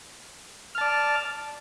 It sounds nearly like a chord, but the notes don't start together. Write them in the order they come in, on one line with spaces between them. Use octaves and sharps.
F6 A5 D5